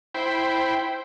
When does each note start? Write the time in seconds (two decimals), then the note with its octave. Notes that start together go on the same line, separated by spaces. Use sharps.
0.14 E4 C5 G5 B5